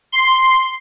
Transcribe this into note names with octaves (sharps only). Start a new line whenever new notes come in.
C6